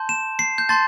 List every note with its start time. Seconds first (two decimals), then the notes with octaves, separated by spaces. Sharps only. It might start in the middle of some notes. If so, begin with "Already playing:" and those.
Already playing: A5 C6 G6
0.09 E7
0.39 C7
0.58 G6
0.69 A5 C6 G6 A6